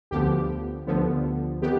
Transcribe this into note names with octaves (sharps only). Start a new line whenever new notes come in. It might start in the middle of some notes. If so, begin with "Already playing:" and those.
D2 D3 F3 B3 G4
D2 D3 F3 B3
D#3 B3 G4